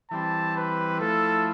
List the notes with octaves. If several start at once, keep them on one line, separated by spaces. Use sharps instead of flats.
E3 G3 C4 A5
B4
F3 A3 E4 A4